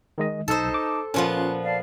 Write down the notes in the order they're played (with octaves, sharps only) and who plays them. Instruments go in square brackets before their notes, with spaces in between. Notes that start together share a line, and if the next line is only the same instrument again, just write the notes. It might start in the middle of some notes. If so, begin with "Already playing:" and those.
[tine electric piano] D#3 G#3 D#5
[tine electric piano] B1 E6 [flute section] D#4 A5 [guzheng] A4 C5
[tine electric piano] D6
[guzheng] A#2 F3 B3 [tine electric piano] C#4 F4 [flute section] F#6
[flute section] D5 F5 A5